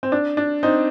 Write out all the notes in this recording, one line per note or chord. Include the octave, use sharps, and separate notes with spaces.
C4
D4
D4
C4 D#4